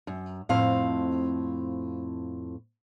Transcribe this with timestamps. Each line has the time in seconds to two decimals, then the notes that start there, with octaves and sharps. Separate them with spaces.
0.07 F#2
0.49 F2 A2 C4 F5